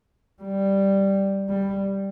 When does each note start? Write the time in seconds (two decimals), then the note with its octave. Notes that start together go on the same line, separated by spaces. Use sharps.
0.42 G3
1.49 G3